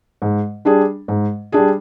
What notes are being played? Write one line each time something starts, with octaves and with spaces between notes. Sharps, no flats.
G#2
G3 D4 G#4
G#2
G3 D4 G#4